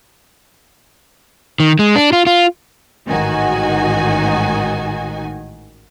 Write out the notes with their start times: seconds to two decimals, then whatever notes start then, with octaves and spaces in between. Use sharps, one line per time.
1.60 D#3
1.79 G#3
1.96 D4
2.13 F4
2.27 F4
3.09 A1 G#2 D#3 D#4 F#4 G#5